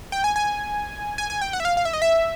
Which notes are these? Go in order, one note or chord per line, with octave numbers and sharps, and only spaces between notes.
G5
G#5
G#5
G#5
G#5
G5
F#5
E5
F5
F5
E5
D#5
E5